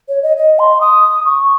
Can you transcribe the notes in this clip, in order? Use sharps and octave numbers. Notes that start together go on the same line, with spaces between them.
C#5
D#5
D#5
C6
D#6
C#6